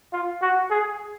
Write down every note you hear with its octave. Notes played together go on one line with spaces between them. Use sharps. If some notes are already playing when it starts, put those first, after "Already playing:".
F4
F#4
G#4